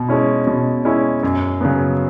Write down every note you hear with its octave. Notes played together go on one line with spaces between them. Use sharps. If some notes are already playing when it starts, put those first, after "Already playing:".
Already playing: B2
G#3 C#4 E4
B2
G#3 C#4 E4
F#2
C#3 F#3 B3